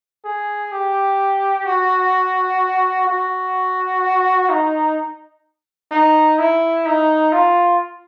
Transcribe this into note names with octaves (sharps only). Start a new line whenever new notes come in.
G#4
G4
F#4
F#4
D#4
D#4
E4
D#4
F4